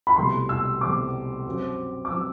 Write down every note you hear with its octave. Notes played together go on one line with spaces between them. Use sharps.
B5
C2 B2 A3 C4 C6
E6
C2 B2 A3 C4 D6
F#2 F#3 C4
D6
F#3 C4 E6